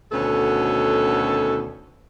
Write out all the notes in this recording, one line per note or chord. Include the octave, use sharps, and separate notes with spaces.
D2 B2 D#3 C#4 A4